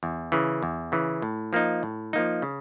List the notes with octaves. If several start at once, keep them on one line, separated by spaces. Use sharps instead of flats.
E2
C#3 E3
E2
C#3 E3
A2
F3 A#3 D#4
A2
F3 A#3 D#4
C#3